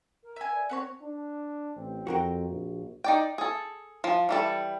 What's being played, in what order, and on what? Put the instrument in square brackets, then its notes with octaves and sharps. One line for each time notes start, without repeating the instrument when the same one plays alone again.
[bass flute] A#4
[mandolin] E5 G#5
[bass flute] D5
[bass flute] C4 [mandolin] F#4 A4 C#5
[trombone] D4
[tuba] A1 [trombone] C4
[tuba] F2 [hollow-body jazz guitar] F#4 A#4 G5
[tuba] A#1
[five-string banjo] D#4 D5 G5
G#4 A4
F3
E3 G3 A4